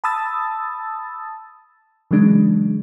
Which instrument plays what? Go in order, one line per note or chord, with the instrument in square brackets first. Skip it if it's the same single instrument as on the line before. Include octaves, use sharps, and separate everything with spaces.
[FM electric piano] A5 B5 D#6 E6 A6
C#3 E3 F#3 G#3 D4